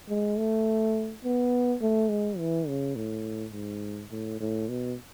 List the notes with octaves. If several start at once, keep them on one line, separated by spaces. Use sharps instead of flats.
G#3
A3
B3
A3
G#3
E3
C#3
A2
G#2
A2
A2
B2